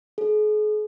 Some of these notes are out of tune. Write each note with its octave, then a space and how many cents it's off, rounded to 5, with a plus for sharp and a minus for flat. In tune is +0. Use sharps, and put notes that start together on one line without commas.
G#4 +40